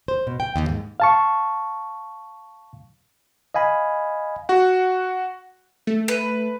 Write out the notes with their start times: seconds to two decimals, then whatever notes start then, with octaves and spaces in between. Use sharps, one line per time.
0.08 C5
0.27 B2
0.40 G5
0.56 D#2
0.69 G#2
1.00 F5 A5 C#6
3.54 D#5 F5 G#5 B5
4.49 F#4 F#5
5.87 A3
6.08 B4